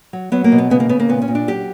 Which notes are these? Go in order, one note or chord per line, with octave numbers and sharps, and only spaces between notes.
F#3
F#3 B3
A#3
B2
B3
C#3 B3
A#3
C#3 B3
A#3
A#2 B3
C#4
A#2
D4
F#3 G4